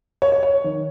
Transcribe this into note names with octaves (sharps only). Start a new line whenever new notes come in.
C#5
C#5
C#5
D#3